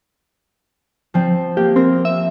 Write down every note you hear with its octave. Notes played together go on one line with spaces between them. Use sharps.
F3 C4
A#3 G4
C4 A#4
E5